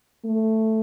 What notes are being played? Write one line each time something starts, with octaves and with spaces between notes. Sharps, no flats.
A3